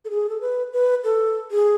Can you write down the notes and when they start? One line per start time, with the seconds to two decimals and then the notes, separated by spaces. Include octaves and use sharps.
0.05 A4
0.10 G#4
0.29 A4
0.41 B4
0.73 B4
1.04 A4
1.51 G#4